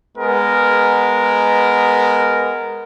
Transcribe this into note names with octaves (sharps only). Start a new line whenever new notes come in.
G#3 B3 A#4